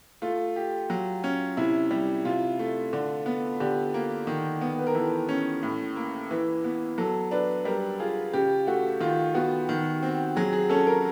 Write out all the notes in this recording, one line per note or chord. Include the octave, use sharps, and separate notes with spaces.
A3 F4
G4
F#3
C#4
C3 E4
G3
C3 F4
A3
D3
B3
D3 G4
A#3
D#3
B3
B4
A#4
E3 A4
C#4
A2
A#3
E3 B4
B3
F#3 A4
D4 B4
G3 A#4
F4 G#4
C#3 G4
A3 F#4
D#3 F4
B3 F#4
D#3
C4
F#3 G#4
G#4
C#4 A4
A#4